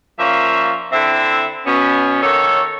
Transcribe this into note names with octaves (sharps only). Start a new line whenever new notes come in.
F3 A#3 C#4 D5 E5
D3 C4 E4 E5
B2 B3 C#4
D#3 A#3 A4 C#5